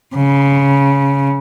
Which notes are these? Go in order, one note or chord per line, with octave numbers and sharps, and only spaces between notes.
C#3